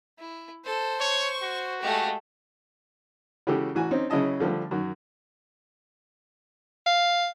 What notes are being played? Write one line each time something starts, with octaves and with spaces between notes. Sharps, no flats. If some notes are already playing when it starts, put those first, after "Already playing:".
E4
A4 C5
C#5 C#6
F#4
G#3 A3 G4 F5
C#3 E3 G#3 F#4 G4 A4
A1 E3 F#4 G#5
C4 C#4 D#4
C#3 F#3 C#4 E4 D#5 A5
D3 F3 G3 A3
F#2 D#3 F#4
F5